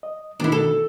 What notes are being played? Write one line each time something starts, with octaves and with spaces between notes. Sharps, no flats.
D#5
B2 D#3 D4 E4 F#4
A4